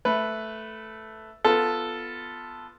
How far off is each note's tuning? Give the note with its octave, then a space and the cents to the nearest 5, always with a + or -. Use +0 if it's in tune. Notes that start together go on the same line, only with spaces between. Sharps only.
A3 +0 B4 +0
B3 +0 F4 +0 A4 +0